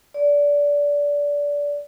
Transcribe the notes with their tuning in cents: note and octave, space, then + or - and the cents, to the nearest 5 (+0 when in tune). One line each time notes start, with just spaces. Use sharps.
D5 -20